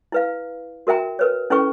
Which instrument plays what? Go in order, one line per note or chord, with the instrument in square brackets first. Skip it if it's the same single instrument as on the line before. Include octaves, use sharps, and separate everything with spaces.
[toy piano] E4 B4 F5
F#4 A#4 E5 G5 A#5
A#4 B4 C#5
C#4 E4 A4 B4 G5 C#6